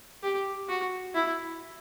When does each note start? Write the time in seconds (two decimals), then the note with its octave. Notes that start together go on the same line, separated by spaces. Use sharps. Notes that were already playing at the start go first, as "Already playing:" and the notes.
0.23 G4
0.69 F#4
1.15 E4